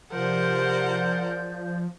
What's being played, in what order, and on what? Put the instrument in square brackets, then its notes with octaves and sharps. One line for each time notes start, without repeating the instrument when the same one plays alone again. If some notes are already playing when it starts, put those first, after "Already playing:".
[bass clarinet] C3 [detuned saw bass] F3 [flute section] G#4 D5 G6 [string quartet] A#4 C5 F#5